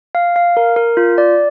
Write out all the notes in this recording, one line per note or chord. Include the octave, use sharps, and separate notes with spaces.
F5
F5
A#4
A#4
F4
D5